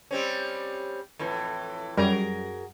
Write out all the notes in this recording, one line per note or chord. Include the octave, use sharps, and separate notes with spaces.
G3 C4 C#4
F2 A2 E3
F#2 G3 F#4 G#4 A#4